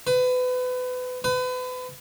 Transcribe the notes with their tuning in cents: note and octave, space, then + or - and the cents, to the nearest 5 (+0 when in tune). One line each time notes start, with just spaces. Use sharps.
B4 +30
B4 +35